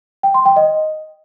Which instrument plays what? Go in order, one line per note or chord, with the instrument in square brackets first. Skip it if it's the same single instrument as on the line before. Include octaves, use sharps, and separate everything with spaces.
[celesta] G5
C6
G5
D#5